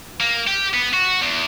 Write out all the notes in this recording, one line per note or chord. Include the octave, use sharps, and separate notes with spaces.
A#3
G4
B3
F#4
E2